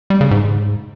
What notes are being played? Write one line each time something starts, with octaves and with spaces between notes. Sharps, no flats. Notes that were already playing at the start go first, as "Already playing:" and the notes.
G3
C#3
G#2